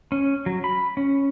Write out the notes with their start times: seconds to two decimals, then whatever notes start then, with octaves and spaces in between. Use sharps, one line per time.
0.12 C#4
0.46 F#3
0.64 B5
0.97 C#4